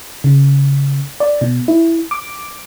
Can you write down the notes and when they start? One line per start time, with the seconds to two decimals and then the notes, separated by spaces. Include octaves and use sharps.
0.24 C#3
1.20 D5
1.41 B2
1.68 E4
2.11 D6